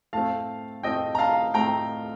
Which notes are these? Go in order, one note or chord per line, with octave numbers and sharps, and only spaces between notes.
A2 A3 C4 F5 A5
A2 A3 C4 D#5 G5
A#5
F5 A5
A2 A3 C4 G5 A#5